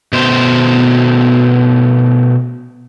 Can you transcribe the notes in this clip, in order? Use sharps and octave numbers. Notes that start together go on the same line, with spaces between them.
B2 A3 C5